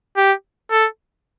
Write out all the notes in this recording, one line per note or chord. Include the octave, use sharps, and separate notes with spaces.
G4
A4